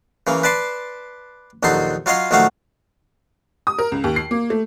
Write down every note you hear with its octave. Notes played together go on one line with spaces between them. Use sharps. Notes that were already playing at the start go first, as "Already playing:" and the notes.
C#3 E3 A#3
B4 D5 A5 C6
A#1 D#2 F#3 D#4 A4 C6
F#3 F4 C#5 D#5 F5 C6
A#1 D#3 F#3 A3 F#4 F5
D#6
A#4
C#2
D#2
C7
A#3
A3